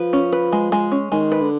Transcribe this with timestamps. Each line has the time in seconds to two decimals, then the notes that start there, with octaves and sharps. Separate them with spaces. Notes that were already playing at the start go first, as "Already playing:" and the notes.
Already playing: F3 B4
0.13 C#4
0.33 B4
0.52 G#3
0.72 G#3
0.92 C#4
1.12 D#3 G#3
1.32 B4
1.41 D3